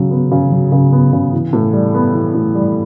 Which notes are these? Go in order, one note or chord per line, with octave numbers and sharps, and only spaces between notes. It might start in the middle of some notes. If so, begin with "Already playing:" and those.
Already playing: C#3 F#3
B3
C#3
F#3
C#3
B3
C#3
E3
A2
G3
B3
E3
A2
G3